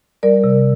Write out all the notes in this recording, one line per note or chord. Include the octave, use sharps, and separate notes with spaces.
G3 A#4 D5
C3